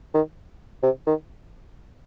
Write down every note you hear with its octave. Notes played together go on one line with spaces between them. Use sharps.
D#3
C3
D#3